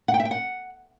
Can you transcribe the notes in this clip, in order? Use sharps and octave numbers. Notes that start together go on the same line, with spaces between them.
F#5
G5
E5
G5
F#5